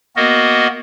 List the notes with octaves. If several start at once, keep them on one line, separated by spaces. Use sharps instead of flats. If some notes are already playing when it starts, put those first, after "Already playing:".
A#3 B3 F#4 A#4 D#5